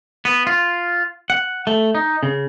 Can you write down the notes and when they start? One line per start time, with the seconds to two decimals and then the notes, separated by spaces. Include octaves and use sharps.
0.25 B3
0.47 F4
1.30 F#5
1.67 A3
1.95 D#4
2.23 C#3